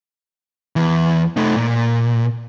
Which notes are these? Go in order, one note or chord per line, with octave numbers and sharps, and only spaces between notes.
E2 E3
A3 D#4
A#2